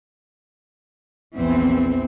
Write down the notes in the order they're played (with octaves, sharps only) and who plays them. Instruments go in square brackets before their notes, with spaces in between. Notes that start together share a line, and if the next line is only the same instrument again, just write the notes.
[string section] A#1 E2 [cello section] E3 C4